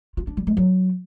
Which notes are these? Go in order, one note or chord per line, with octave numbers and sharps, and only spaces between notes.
F4
D4
G3
G#3
F#3